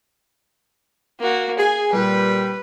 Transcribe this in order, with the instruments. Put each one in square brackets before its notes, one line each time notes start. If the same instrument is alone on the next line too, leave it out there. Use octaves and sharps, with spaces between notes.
[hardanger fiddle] A#3 F#4
[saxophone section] G#4 [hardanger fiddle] G#5
[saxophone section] A#2 G3 [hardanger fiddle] B4